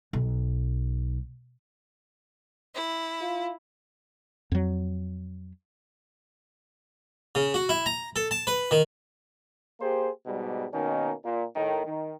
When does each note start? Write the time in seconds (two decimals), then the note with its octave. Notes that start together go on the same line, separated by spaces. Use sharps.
0.13 B1
2.75 E4
3.22 F4
4.52 F2 F#3
7.35 C#3
7.54 F#4
7.69 E4
7.86 A#5
8.16 A4
8.31 A5
8.47 B4
8.71 D#3
9.80 A#3 G4 G#4 C5
10.26 G#2 B2 G3
10.72 B2 D#3 A#3 C#4 D#4
11.23 A#2
11.56 A2 D#3
11.85 D#3